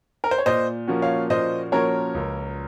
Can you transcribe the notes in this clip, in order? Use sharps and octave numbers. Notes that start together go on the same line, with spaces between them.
A#4
C5
C#5
A#2 C5 D#5
F3 A#3 C#4 F#4
C#5 F5
A#2 C5 D#5
F3 A#3 C#4 F#4 A#4 C#5
C#2